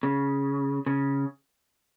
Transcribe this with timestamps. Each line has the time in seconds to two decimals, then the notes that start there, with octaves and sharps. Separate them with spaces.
0.03 C#3
0.86 C#3